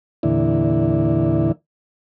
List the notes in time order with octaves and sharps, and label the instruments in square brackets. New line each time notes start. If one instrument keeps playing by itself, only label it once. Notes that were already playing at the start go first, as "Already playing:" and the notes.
[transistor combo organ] E2 A#2 D3 E4